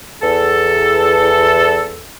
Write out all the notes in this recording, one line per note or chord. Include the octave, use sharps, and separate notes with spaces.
E2 A4